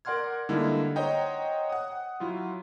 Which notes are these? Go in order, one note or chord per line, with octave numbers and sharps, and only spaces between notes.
A#4 D5 F#5 C6 F6 G#6
D3 G3 G#3 A#3 D#4 E4
C5 C#5 D#5 F#5 G5 A#5
F#5 D#6
F#3 E4 F4